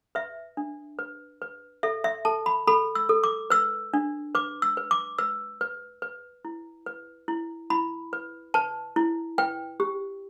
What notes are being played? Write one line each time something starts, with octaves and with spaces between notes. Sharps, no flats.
B4 E5
D4
B4
B4
A4 E5
E5
A4 A5
B5
A4 B5
E6
A4
D6
B4 E6
D4
B4 D6
E6
B4
D6
B4 E6
B4
B4
E4
B4
E4
E4 B5
B4
B4 A5
E4
B4 G5
G4